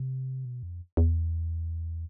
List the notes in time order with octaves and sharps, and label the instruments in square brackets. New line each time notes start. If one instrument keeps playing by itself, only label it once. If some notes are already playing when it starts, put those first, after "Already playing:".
Already playing: [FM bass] C3
B2
F2
E2